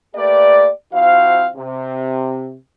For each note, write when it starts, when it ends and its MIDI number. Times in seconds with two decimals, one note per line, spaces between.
0.15 0.69 57
0.15 0.69 58
0.15 0.69 67
0.15 0.69 71
0.15 0.69 74
0.93 1.48 53
0.93 1.48 60
0.93 1.48 64
0.93 1.48 66
0.93 1.48 77
1.55 2.54 48